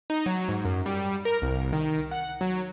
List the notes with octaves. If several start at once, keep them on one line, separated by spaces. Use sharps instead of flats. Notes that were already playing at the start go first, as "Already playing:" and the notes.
D#4
F#3
G#2
F#2
G3
A#4
C2
D#3
F#5
F#3